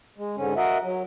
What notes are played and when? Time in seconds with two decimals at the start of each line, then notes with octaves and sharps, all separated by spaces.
0.18 G#3
0.37 G#2 D3 C#4
0.57 F#4 A#4 D#5 E5 F#5
0.82 F#3